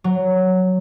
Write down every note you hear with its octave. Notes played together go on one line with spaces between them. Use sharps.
F#3